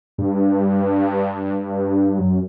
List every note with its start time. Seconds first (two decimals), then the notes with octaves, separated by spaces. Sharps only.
0.18 G2
2.18 F#2